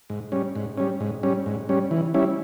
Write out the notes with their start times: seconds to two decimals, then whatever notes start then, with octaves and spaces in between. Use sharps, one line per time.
0.10 G#2
0.32 G3 C#4
0.55 G#2
0.78 G3 C#4
1.00 G#2
1.23 G3 C#4
1.46 G#2
1.69 G3 C#4
1.91 E3
2.14 G3 C#4 E4